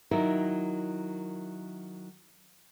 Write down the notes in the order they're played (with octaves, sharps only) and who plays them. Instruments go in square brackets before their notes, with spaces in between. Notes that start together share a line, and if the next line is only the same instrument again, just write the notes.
[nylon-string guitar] D#3 F#3 E4 A#4